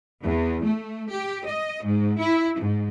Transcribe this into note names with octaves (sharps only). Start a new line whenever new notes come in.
E2
A3
G4
D#5
G#2
E4
G#2